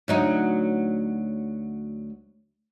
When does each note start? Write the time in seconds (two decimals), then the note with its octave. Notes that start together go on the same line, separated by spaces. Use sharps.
0.08 D2 F#3 D#4